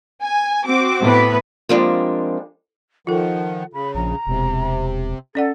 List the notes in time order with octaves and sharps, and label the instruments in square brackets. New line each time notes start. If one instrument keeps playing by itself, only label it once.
[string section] G#5
C4 F#4 D6
[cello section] A2 B3 B4
[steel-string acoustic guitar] F3 G3 G#3 A#3 C4 D4
[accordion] D#3 F3 [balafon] F4 A4 [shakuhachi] F#5
[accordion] C#3 [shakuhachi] B5
[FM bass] A#1 [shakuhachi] A#5
[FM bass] E1 [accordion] C3
[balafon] C#4 D5 F#5 [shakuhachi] A4